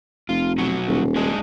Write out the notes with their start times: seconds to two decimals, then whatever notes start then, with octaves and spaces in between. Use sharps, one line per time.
0.29 F1 F4
0.58 B2 F#3 F#4
0.87 D#1
1.16 G#3 D4 D#4